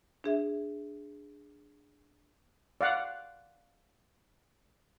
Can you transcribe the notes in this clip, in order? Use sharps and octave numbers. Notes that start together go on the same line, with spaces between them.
D4 G#4 E5
D5 F5 F#5